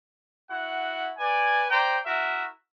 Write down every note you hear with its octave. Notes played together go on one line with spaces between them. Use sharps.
E4 F#4 F#5
B4 D5 G#5
C5 D5 G5 A#5
E4 F#4 A#4 E5